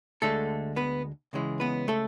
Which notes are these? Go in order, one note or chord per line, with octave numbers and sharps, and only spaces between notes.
D2 D3 G#3 A3 A4
B3 B4
C#2 C#3 E3 G#3
B3 B4
A3 A4